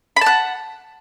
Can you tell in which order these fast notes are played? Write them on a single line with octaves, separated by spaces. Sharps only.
B5 A5 F#5